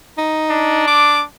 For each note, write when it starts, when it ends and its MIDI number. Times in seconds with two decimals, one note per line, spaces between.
0.18 0.85 63
0.50 1.25 62
0.88 1.21 86